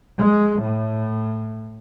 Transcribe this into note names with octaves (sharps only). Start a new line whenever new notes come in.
G#3
A2